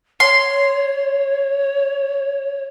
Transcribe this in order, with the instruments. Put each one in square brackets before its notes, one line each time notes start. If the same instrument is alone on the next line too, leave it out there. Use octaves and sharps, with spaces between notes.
[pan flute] C#5 [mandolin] C6